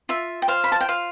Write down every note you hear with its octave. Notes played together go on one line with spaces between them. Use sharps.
F4 E5
G5
C5 F5
B5
A5
G5
F4 F5